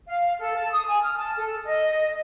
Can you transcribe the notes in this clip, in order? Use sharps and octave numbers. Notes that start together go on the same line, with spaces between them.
F5
A4
A5
D#6
G#5
F6
A5
A4
D#5